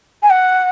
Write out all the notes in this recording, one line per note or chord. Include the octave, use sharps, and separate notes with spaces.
G#5
F#5